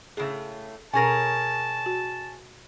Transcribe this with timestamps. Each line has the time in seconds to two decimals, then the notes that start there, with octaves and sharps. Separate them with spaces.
0.17 A2 C#3 A3 G#4
0.93 B2 C#4 G#4 A#4 G#5 A5 C#6 A#6
1.86 F#4